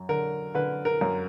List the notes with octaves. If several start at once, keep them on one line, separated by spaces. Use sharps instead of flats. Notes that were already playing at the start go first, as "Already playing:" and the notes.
Already playing: F#2
D3 A#4
D3 B4
A#4
F#2